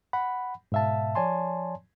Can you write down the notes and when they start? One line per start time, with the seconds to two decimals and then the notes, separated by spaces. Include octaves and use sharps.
0.13 F#5 B5
0.72 G#2 B2 E5 F5 A5
1.15 F3 C#5 D5 G#5 A5 C6